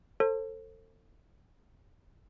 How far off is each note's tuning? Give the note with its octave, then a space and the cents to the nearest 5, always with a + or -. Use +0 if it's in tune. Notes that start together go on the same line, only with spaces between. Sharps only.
A4 +25 C5 +30